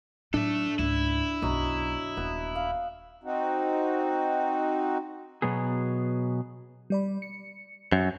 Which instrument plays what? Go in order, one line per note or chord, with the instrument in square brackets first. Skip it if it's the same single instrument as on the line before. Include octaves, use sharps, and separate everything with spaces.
[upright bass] A2 F#3 [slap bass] D4 [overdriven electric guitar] A4 E5
[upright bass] C#2 G#2 [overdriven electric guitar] E4
[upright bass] B1 F#2 [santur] F#3 D#5
[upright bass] D#1 [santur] B3
[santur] F5
[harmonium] C4 D#4 F#4
[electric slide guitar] B2 F#3 B3 G#4
[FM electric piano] G3 D5 B5
C#7
[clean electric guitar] F#2